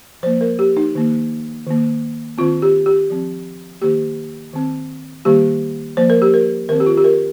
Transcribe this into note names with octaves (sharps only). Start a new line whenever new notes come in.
F3 A#3 C5
A#4
G4
D#4
D#3 A#3
D#3 A#3
D#3 C4 F4
G4
G4
F3 C4
D#3 A#3 G4
D#3 C4
D#3 G3 A#3 G4
F3 A#3 C5
A#4
G4
A#4
D#3 C4 A#4
G4
F4
G4
A#4